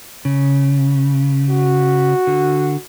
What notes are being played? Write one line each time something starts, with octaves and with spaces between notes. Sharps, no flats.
C#3
F#4
D3